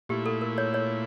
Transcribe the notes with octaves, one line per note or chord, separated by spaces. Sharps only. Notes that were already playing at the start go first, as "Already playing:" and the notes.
A#2 A3 E4 G4
A4
A#4
C#5
C#5